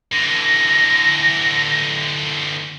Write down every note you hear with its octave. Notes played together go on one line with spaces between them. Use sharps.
D3 E3 A#6